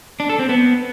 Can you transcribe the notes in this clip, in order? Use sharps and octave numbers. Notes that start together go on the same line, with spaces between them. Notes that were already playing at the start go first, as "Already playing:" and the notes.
D4
A4
C4
B3